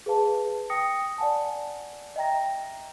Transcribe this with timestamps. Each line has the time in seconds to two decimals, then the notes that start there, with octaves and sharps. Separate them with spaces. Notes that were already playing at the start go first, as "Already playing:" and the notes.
0.06 G#4 B4 F5 A5
0.70 G5 D#6 A#6 C#7
1.18 D5 F#5 G#5 A5
2.16 D#5 E5 G5 A#5 A#6